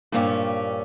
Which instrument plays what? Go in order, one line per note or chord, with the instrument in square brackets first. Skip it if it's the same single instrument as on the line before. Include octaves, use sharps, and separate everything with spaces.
[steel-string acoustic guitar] G2 A#2 F3 C#4 F4 G4